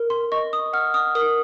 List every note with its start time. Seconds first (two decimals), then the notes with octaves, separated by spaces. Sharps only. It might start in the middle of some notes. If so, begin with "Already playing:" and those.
Already playing: A#4
0.10 C6
0.32 D#5 C#6
0.53 D#6
0.73 F#5 F6
0.94 D#6
1.15 A#4 D#6